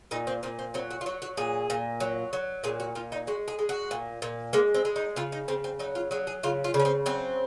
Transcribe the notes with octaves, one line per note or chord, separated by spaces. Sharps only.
A#2 D#4
C4
A#2 C4
C4
F#3 C4
F#4
F4
F#3 F#4
F#4
A#2 G#4
A#2
F#3
F#3
A#2 G#4
F#4
A#2 F4
D#4
G#3 F#4
G#4
G#3
F#4
A#2
A#2
G#3 A#3
C4
G#3
D#4
C#3 F4
D#4
C#3 C4
C4
F#3 D#4
F4
F#3 G#4
G#4
C#3 F4
F4
C#3
C#4
C4
F#3 C4